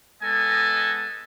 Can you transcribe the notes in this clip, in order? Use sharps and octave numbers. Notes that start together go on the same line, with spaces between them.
G#3 B3 A4 D#5 G#5